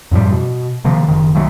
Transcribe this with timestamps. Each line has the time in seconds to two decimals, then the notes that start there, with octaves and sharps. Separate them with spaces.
0.11 F#2 A2 F3 G3
0.32 B2
0.85 C3 D#3 F3 A#3
1.08 F#1 D#3
1.35 B1 D#3 F#3 A3